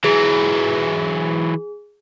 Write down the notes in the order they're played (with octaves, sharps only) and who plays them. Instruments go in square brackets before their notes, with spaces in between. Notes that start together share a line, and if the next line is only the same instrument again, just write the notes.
[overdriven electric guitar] E3 F#3 [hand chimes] G#4